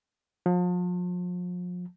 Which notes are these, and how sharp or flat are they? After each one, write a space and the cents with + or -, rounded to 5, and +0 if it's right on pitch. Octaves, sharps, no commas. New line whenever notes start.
F3 +40